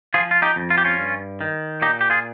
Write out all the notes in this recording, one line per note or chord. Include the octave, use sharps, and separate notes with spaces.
F3 F4 G#4
F4
D#4 G4
F2
F4
G4
C#4 F4
G2
D#3
A#2 D#4 G4
G4
F4 G#4